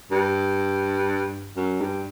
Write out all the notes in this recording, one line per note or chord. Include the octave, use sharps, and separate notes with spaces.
G2
F#2
G2